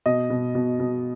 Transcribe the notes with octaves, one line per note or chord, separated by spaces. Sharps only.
B2 D#5
B2
B2
B2